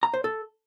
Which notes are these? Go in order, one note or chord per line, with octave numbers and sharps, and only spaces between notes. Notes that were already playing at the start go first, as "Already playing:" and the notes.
A#5
C5
A4